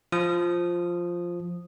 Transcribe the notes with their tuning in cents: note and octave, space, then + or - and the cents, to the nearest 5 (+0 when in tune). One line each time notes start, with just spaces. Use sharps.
F3 +0 F4 +0 D#6 -10